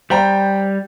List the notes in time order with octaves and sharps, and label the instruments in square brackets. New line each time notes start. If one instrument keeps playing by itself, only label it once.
[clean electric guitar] G3 [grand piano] C5 G5 A#5